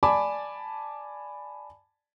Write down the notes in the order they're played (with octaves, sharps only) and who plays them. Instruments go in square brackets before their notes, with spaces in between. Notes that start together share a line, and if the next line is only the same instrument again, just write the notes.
[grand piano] D5 G#5 A5 B5 D6